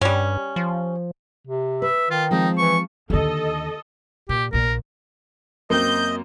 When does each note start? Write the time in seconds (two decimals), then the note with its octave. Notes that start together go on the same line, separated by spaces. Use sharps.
0.01 G2 G3 C#4
0.56 F3
1.48 C3
1.82 B4 E5
2.10 D#3 F4
2.31 F3 G#3 C4 D#4
2.58 E3 C#6
3.10 D#2 D3 A4 D#5
4.29 A#2 G4
4.53 A#1 A#2 A#4
5.70 F#2 A#3 C4 D#5 G6